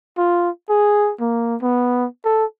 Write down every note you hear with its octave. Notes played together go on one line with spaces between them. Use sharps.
F4
G#4
A#3
B3
A4